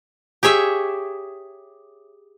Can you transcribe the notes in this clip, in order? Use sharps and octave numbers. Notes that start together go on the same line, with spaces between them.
G4 G#4 C#5 E5